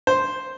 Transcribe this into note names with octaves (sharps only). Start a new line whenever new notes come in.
C5